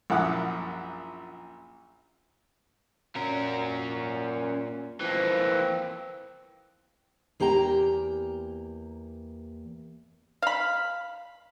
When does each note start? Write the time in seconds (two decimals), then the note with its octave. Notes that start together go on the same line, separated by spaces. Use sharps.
0.10 A#1 F#2 E4 F#5 D6 D#6
3.17 A#2 C#4 A#4
5.01 E3 F3 A#3 C4
7.40 E2 A#3 G4 G5 A#5
10.42 F5 B5